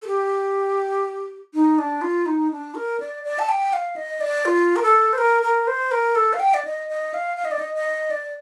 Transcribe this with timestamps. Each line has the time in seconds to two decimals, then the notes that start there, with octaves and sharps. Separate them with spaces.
0.02 A4
0.07 G4
1.54 D#4
1.78 D4
2.02 F4
2.26 D#4
2.51 D4
2.75 A#4
3.00 D5
3.24 D5
3.39 A5
3.49 G5
3.73 F5
3.96 D#5
4.21 D5
4.45 F4
4.76 A#4
4.83 A4
5.13 C5
5.18 A#4
5.42 A#4
5.67 C5
5.91 A#4
6.15 A4
6.33 F5
6.40 G5
6.54 D5
6.65 D#5
6.89 D#5
7.14 F5
7.37 F5
7.45 D#5
7.51 D5
7.59 D#5
7.75 D#5
8.11 D5